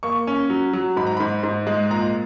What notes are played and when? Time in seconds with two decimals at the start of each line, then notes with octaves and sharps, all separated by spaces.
0.03 A#3 C#6
0.27 C#4
0.50 F#3
0.73 F#3
0.97 G#2 B5
1.06 A#5
1.17 G#2 B5
1.43 G#2
1.67 G#3
1.90 A#2 A#5